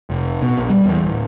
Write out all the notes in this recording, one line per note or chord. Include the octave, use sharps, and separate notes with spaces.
F1
B2
A#1
G3
E2
D1